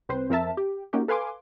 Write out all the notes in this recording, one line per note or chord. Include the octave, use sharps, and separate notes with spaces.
C2 C4 B4 C5
F2 C4 A#4 E5 A5
G4
A#3 C#4 D#4 F#4 G4
A4 B4 F5 G#5 C6 D6